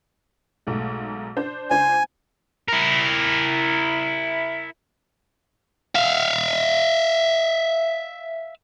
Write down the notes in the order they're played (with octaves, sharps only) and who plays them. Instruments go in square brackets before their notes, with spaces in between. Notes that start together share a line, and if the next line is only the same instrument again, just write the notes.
[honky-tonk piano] B1 G#2 A3
D4 C5 G6
[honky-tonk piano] C#2 D4 C5 [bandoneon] G#5
[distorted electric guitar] E4 A#4
[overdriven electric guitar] E5 F5